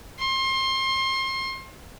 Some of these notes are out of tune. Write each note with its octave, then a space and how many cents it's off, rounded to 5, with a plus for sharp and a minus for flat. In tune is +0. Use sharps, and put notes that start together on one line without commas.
C6 +30